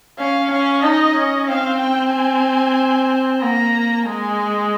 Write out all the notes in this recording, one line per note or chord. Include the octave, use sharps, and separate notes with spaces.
C#4 F5
C#4 F5
D#4 D#5
C#4
C4 F5
G5
G#5
A#3 A#5
G#3 G#5